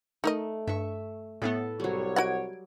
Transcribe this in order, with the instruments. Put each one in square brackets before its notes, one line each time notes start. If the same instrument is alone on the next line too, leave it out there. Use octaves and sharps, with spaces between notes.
[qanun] A3 [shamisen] D#4 A#4 D#5
[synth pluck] G2 [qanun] E5 C#6
[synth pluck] A2 A3 B3 [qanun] A4 B4 A5
[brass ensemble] C2 C#5 [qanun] F#3 G3
[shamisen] F#4 D#5 F#5 [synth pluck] G#6 D7